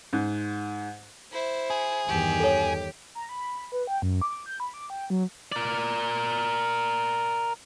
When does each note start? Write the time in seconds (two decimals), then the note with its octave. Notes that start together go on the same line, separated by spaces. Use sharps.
0.13 G#2
1.32 E4 C5
1.70 G#4
2.08 E2 G2 D#3 G4
2.40 A4 C#5
3.15 A#5
3.29 B5
3.72 B4
3.87 G5
4.02 F#2
4.21 D6
4.46 G6
4.60 B5
4.74 D6
4.90 G5
5.10 F#3
5.52 A#4 D5